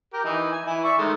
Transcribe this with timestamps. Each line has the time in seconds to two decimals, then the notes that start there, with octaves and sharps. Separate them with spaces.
0.13 G4 A#4
0.24 E3 D#4
0.52 G#5
0.66 E3 E4
0.84 D5 E5 C#6
0.98 D#3 G#3 A3